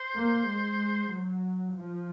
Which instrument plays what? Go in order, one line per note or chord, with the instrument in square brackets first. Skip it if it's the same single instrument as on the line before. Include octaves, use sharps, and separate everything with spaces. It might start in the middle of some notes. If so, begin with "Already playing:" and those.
Already playing: [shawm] C5
[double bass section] A#3
G#3
F#3
F3